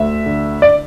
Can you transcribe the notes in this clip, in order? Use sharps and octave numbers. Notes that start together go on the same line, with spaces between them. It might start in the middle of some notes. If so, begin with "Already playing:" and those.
Already playing: D2 E5
D3
D5